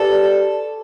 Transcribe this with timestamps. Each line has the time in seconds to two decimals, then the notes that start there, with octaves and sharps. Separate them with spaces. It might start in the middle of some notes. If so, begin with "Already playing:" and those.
Already playing: G4 A4 B4 D5 A5